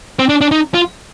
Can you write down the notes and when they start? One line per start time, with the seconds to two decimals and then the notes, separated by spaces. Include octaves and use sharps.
0.19 C4
0.29 D4
0.41 D4
0.52 D#4
0.74 F4